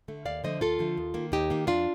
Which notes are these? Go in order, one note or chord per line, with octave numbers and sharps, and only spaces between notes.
D3 A3
D#2 D5 F5
D3 F3 A3 C5 D#5
D#2 F4 A4
D3 F3 A3
D#2
D#3 A#3
D#2 D#4 G4
D#3 A#3
F2 D4 F4